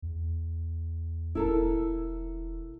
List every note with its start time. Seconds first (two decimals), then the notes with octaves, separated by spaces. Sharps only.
0.02 E2
1.35 E1 E4 A4 A#4